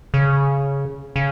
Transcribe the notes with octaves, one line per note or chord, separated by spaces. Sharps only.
C#3
C#3